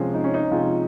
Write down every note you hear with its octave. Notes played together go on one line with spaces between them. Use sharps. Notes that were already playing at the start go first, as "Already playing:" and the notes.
Already playing: C3 F3 G#3 C#4
D#4
C#4
D#4
C3 F3 G#3 F4